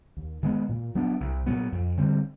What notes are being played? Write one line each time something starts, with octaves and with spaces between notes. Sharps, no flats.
D#2
D#3 G#3 B3
A#2
F#3 B3 D4
C2
A#2 F#3 B3
F2
D3 G3 C4